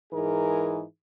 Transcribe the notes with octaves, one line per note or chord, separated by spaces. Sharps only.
G#2 E3 D#4 G#4 A#4